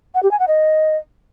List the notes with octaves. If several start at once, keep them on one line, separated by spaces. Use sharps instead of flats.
F#5
G4
G#5
F#5
D#5